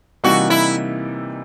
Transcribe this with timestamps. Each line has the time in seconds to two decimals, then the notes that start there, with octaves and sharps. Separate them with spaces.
0.24 C3 E3 G3 A#3 D#4 F#4
0.50 E4